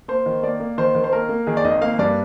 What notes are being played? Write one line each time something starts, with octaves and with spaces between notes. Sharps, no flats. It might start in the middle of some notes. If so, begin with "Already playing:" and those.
A#3 C5
D#3
A#3 D5
A#3
D#3 C5
D#3
C5
A#3 A#4
A#3
D#3 G#4
D5
G#1 D#5
A#3 F5
G2 D5